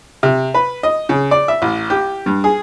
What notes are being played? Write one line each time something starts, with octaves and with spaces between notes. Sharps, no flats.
C3
B4
D#5
C#3
D5
E5
A1
G4
G2
G#4